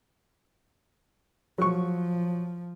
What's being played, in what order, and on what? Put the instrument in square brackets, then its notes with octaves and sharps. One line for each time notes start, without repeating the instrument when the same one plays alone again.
[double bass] F3 [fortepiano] F#3 C#6